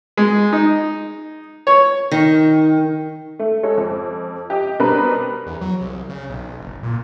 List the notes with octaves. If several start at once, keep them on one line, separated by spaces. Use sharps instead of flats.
G#3
D#4
C#5
D#3
A3
G#3 A4 C#5
F2
G4 D#5
B2 G3 C4 D4 A#4 B4
E2
F#3
C2
C#3
B1
F#1
A#2